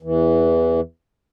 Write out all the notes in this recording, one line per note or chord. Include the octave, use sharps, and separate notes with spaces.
E2 E3